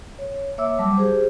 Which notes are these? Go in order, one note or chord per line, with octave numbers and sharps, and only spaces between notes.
C#5
A#3 C#5 E5 D6 E6
F#3 G3 A5 D6
G4 G#4 C5